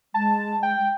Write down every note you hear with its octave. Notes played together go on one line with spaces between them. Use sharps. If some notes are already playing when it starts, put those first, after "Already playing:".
G#3 A5
G5